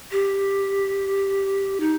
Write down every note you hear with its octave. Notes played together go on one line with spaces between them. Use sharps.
G4
D#4